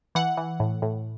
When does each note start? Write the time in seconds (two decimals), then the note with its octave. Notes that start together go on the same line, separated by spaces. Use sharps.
0.15 E3 F#5
0.37 E3
0.60 A2
0.82 A2